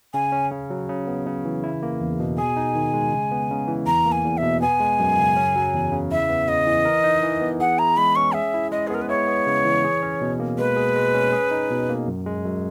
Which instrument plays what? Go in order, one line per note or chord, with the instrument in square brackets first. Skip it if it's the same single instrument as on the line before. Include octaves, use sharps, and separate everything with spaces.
[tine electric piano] C#3 [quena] G#5
[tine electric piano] C#4
C#3
F#3
C#3
B3
C#3
E3
E4
A#3
E2
B2
[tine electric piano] G#4 [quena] G#5
[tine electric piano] D#4
D#3
G#3
C#3
B3
C#3
E3
[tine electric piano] E2 [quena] A#5
[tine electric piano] A#3
[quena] G#5
[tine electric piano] E2
[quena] E5
[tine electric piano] B2
[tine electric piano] B3 [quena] G#5
[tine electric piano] G#3
F#2
C#3
C#4
F#3
E2
C#3
[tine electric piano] E4 [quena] E5
[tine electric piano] B3
[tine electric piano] C#3 [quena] D#5
[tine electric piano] E3
A#4
D#4
E3
B3
[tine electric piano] G#4 [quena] F#5
[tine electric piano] E4 [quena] A#5
[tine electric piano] G#3 [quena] B5
[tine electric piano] C#4 [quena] C#6
[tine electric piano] G#4 [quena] E5
[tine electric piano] E4
[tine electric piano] G#3 [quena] D#5
[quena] G#4
[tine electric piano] B3 [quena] A#4
[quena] B4
[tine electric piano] E4 [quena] C#5
[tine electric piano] B3
C#3
E3
G#4
C#4
B2
A#3
[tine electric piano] G#3 [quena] B4
[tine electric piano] G#4
G#3
C#4
G#4
D#4
B2
A#3
F#2
G#3
F#2